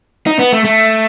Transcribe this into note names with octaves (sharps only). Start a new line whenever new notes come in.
D#4
B3
A3
A3